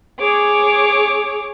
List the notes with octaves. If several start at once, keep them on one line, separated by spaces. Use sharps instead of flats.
G#4 C#5 D6